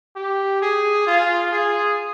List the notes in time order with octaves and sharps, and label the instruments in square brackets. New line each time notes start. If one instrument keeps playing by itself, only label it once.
[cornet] G4
G#4
F4
G#4